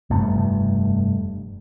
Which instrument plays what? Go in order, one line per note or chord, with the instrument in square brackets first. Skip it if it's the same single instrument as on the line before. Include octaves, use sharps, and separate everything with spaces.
[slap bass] F1 G2 A3